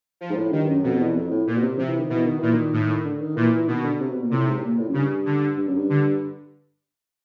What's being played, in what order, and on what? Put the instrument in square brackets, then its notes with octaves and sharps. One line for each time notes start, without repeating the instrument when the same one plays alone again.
[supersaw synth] F3
[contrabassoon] G#2
A2
[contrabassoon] G2 [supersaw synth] D#3
[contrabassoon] F#2
[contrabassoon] F2 [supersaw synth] B2
[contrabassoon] E2
F2
A2
[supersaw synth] A#2
[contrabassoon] B2
C3
[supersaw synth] C3 [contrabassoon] F3
[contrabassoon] E3
D#3
[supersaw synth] B2 [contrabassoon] E3
[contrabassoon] D#3
[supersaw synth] A#2 [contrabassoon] E3
[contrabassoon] D#3
[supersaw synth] A2
[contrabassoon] D3
D#3
[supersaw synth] A#2 [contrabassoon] E3
[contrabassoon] E3
[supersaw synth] B2 [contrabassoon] D#3
[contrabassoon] D3
C3
B2
A#2
[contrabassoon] A2 [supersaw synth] C3
[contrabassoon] G#2
A2
A#2
A2
F#2
[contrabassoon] G2 [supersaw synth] C#3
[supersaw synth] D3
[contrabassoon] G2
F#2
G2
[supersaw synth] D3